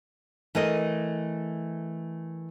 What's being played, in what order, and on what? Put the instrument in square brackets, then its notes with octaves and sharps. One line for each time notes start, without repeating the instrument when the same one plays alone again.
[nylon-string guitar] E3 A3 A#4 D#5